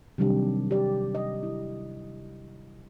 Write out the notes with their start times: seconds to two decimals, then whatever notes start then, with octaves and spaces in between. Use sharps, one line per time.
0.18 C3 D#3 F#3 G3 D4 G4
0.71 G4 D5
1.15 D#5
1.43 E4